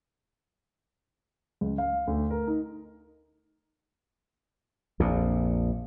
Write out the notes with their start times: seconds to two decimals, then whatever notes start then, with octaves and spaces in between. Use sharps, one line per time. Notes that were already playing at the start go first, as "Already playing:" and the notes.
1.61 C#2
1.78 F5
2.07 D2
2.31 A#4
2.47 D#4
5.00 A#1 F2 A#2